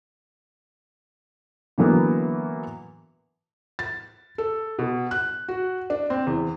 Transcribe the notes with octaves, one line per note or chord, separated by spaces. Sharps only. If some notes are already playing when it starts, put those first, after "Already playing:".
D3 E3 F#3 A#3 B3
A6
A4
B2
F#6
F#4
D4
C4
E2